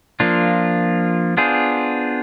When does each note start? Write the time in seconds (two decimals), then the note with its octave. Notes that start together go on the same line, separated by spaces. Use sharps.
0.20 F3 A#3 D4 F4
1.37 B3 D4 F4 G#4 C5